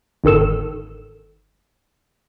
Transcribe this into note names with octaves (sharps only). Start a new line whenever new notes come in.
G1 G#2 D#3 A4 E7